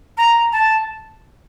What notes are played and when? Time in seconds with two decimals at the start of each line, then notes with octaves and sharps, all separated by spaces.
0.17 A#5
0.52 A5